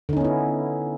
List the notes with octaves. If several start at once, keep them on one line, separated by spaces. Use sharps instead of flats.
D3 B3 C#4 D#4 E4